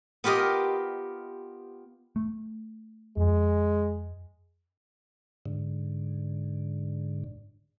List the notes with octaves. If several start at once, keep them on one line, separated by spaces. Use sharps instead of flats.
B3 F4 G4 A#4 D#5
A3
F2 G#3
G#2 D3